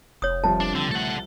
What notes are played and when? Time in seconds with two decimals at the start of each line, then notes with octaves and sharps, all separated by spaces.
0.22 F1 C#5 D#6
0.44 C2 F3 A5
0.60 D4
0.75 D3 C4
0.91 A3 A4 F#5